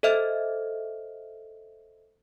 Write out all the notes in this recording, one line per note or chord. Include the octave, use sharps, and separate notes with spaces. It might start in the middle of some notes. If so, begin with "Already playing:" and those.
A4 C5 D#5 E5 F6